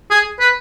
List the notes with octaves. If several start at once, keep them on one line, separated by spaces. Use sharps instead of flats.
G#4
B4